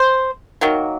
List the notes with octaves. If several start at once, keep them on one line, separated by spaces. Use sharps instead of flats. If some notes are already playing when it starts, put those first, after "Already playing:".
Already playing: C5
D#3 F#3 A#3